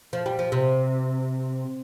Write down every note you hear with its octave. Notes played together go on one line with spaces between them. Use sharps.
F3
G3
F3
C3